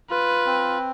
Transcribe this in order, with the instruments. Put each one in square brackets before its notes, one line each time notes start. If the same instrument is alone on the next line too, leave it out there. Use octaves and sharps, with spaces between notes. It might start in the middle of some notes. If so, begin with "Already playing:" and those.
[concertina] F4 [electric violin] B4
[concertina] C4